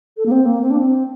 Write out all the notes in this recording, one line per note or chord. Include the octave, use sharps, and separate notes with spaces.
A4
A#3
C4
A#3
C4
D4
C4